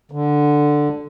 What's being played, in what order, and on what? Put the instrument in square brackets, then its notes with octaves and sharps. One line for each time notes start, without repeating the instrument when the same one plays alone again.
[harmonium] D3